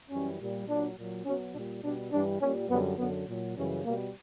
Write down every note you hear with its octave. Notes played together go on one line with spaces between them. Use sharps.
F#2 E3 G3 C#4
A#2 G3
A#2 F#3 D4
A#2 F#3
B2 F#3 C#4
A#2 G3 D4
B2 G3 D4
G2 E3 G3 D4
A#2 G3 C#4
F#2 D3 G3 B3
F#2 D3 F#3 B3
A#2 F#3
F#2 C#3 E3 G3 C#4
B2 G3 A#3